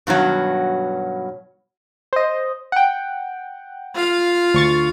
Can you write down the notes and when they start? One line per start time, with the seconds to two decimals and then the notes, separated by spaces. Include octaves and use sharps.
0.07 G2 B2 D#3 F#3
2.13 C5 D#5
2.72 F#5 G5
3.95 F4 F5
4.54 D2 C#6 A6